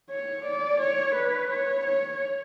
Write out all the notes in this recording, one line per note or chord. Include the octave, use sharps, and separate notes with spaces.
C#5
D5
C#5
B4
C#5
C#5